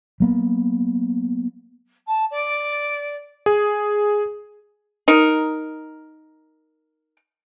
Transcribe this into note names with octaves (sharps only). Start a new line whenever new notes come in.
F#3 A#3 B3
A5
D5
G#4
D#4 A#4